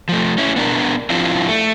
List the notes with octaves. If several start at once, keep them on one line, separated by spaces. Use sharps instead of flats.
F3 A3
C#4 E4
B3 D4 A#4
F3 C4 D4 E4 F4
A3